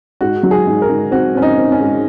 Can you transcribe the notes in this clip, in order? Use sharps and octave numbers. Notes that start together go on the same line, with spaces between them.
G#2 F#4
F#3
G#4
G#2
A#4
G#2
C4 F#4
C4 C#4
D#4
C4
C#4
G#2